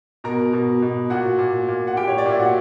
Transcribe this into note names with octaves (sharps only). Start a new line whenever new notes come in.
B2 A#4 A#5
B2
B2
A#2 F#4 F#5
A#2
A#2
F#5
A#2 G4 G5
C#5
D5
A#2 E5
F#4 F#5